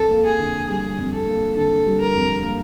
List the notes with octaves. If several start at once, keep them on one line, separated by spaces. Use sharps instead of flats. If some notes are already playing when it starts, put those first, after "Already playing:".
Already playing: F2 A4
A#3
G#4
D3
G3 G#4
F2
A4
A#3
D3 A4
G3
A#4
F2
A#3